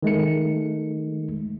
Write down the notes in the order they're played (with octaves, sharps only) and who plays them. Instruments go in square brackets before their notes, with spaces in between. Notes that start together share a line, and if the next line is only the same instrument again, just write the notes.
[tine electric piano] D#3 G#3 A3 C#7